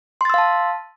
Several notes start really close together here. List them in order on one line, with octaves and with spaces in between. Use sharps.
C6 A6 E6 F5 A5